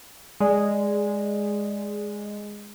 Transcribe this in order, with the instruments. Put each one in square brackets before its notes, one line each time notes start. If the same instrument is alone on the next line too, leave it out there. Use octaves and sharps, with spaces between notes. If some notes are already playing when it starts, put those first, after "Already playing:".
[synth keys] G#3 [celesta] D5